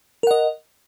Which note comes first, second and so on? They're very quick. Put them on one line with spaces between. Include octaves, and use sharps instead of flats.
A#4 F#5 D#5